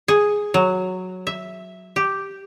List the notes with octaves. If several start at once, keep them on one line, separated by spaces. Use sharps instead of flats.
G#4
F#3
E5
G4